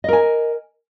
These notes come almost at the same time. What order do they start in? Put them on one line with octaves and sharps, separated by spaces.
D#5 A#4 G#5